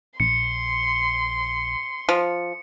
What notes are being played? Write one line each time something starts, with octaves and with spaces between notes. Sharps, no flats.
A#1 C6 C#7
F3